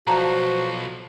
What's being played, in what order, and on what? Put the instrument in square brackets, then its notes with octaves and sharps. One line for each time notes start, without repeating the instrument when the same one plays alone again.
[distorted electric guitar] B1 [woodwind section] F3 [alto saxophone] F#4 [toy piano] D5 A5 A#5